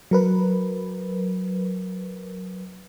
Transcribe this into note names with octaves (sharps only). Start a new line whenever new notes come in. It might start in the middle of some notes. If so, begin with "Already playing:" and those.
F#3 A#4 B4